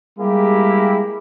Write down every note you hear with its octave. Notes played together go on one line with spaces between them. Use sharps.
G3 G#3 A#3 E4 G4